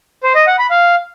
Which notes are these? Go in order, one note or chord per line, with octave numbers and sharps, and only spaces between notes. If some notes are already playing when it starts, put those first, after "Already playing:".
C5
D#5
F#5
B5
F5